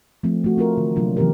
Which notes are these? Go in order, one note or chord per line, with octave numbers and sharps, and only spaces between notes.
F3 A3 C4
A3 F#4
C4 F4 A#4
D3 E3
C3 F#3 A#3 D4 F4
C#3 E3 F#3 B3 G4 A#4